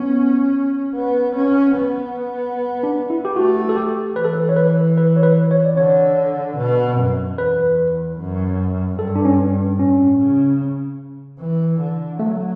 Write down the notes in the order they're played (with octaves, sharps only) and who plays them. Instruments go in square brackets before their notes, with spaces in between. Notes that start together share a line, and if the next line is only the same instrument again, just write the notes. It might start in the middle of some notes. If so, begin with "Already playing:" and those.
Already playing: [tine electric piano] B3 [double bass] C#4
[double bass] B3
C#4
B3
[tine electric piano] D4
E4
G4
[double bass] A3 [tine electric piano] F#4
[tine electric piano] A4
G4
[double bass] E3 [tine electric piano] B4
[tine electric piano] A4
B4
C#5
B4
B4
C#5
B4
C#5
D5
[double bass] D3 [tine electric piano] C#5
[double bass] B2
F#2
[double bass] E2 [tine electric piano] B4
[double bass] F#2
[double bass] G2 [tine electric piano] A4
[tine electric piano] D4
C#4
[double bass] A2 [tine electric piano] C#4
[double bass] C#3
E3
D3
[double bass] F#3 [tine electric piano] A3